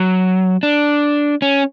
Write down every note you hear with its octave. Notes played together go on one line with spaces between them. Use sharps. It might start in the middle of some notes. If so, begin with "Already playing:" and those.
Already playing: F#3
D4
C#4